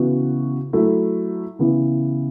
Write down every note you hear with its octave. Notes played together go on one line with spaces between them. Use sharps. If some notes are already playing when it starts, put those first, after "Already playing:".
Already playing: C#3 E3 B3 F#4
F#3 A3 E4
C#3 E3 B3 E4